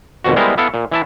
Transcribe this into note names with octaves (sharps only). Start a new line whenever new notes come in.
G#1 F2 B2 F#4
G3 G#3 B3 E4 A#4 C5
B3 E4 A4 F5
A#2
E3 E4 A5